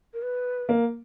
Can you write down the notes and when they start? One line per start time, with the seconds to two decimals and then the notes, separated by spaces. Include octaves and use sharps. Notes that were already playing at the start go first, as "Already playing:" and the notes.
0.14 A#4
0.22 B4
0.69 A#3